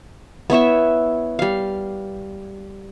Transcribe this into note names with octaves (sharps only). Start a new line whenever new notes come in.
B3 E4 C#5 E5
G3 F5